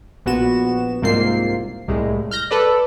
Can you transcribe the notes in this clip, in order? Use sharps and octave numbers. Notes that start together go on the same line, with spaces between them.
A#1 B3 F#4 E7
C2 G#2 A#3 C4 F4 C7
C2 A2 G#3
F6 G6 A#6
A4 B4 D5